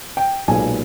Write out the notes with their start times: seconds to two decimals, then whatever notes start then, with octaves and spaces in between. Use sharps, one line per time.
0.17 G5
0.48 B1 A#2 G#3 B3 G#5